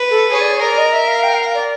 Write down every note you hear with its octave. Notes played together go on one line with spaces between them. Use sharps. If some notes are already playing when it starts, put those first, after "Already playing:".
Already playing: B4
A4
G#4 C#5
D5
C#5
A#4 D5
D#5
E5
F5
G5
F5
D5